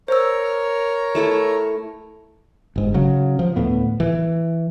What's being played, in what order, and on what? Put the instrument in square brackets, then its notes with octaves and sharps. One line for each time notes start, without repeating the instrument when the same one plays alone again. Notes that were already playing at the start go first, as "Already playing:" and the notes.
[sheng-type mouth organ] A#4 C#5 [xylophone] C5 E6
[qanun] A3 E4 A4
[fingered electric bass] G1 G#2
C#3 F#3
F3
D2 A2 B3
E3